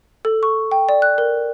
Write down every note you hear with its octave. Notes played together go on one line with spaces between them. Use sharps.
A4
C#6
G5
D5
F#6
A#4